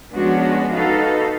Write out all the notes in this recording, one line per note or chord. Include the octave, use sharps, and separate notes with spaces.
F3 G#3 B3 C#4 D4 F#4
D#4 F#4 A4 B4 F5